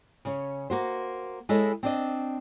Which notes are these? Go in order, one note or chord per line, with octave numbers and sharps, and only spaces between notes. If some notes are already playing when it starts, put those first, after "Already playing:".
C#3 C#4 C#5
A#3 F#4 C5
G#3 E4 A4 C#5 D#5
C4 D4 D#5